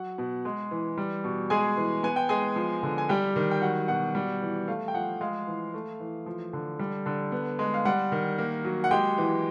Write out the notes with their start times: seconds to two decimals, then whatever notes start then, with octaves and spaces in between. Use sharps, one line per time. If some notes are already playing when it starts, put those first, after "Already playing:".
Already playing: F#3 F#5
0.18 B2
0.45 G#3
0.71 E3
0.97 G3
1.24 B2
1.50 G#3 G#4 G#5
1.77 E3
2.03 B3 G#5
2.16 G5
2.29 G#3 G#4 G#5
2.56 F3
2.83 D3
2.98 G#5
3.09 G3 G4 G5
3.36 D#3
3.51 G5
3.62 F#3 F#5
3.88 B2 F#5
4.15 G3
4.42 E3
4.68 A3 F5
4.88 G5
4.94 F3 F#5
5.21 G#3 F5
5.47 E3
5.74 A3
6.00 E3
6.26 F3
6.53 D3
6.79 G3
7.06 D3
7.32 B3
7.59 G#3
7.74 F5
7.85 G3 F#5
8.12 D#3
8.38 A#3
8.64 F#3
8.84 F#5
8.91 G#3 G4 G5
9.18 E3